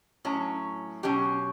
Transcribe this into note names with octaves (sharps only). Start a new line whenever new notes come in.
A2 F#3 C#4
B2 F#3 C#4 G4